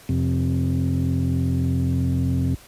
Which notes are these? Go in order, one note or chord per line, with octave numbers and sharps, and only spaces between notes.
F2 C3